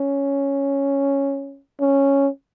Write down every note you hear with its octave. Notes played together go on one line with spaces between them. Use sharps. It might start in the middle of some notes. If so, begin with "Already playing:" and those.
Already playing: C#4
C#4